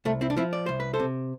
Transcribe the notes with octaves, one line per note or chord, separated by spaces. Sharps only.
C2 A3
C4 E4
D4
F3 C4 E4
D5
C2 C5
B4
A4 C5
C3